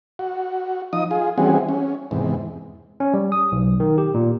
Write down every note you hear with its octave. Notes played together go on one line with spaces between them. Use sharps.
F#4
F3 D#4 D#6
F4 G#4
E3 G3 C4 C#4 F#4 G#4
C#4
E2 G#2 C3
C#4
G3
D#6
B1
D#3
G4
A#2